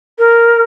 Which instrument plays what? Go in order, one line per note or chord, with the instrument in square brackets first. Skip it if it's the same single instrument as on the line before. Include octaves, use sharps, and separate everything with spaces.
[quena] A#4